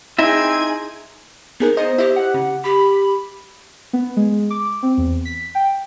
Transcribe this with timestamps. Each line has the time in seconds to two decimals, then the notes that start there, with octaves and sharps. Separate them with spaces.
0.18 C4 D#4 E4 G#4 D#5 E5 G#6
1.60 B3 D#4 G#4 A#4
1.77 B3 C5 D#5 A#5 D#6
1.98 E4 G4 D#5 E5
2.16 F#5
2.34 C#3
2.64 G4 B5
3.93 B3
4.17 G#3
4.50 D6
4.83 C4
4.97 E2
5.25 B6
5.55 G5